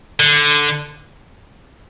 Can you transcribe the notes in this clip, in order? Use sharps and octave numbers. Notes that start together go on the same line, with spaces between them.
D3